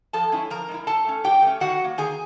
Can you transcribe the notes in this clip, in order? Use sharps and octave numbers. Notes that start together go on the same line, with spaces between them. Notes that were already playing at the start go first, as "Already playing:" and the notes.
F3 A4 A5
G#3 C#4 E4
F3 A#4 A#5
G#3 C#4
E4
F#3 A4 A5
A3 C#4
F#3 G4 G5
A3 C#4
D#3 F#4 F#5
F#3 A#3
D#3 G#4 G#5